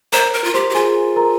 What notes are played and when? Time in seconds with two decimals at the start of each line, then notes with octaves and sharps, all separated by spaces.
0.13 A#4 C5 A#5
0.34 A#4
0.44 F4
0.54 G4 C5 C6
0.69 G4
0.74 F4 G#4 G#5
1.16 A#4 A#5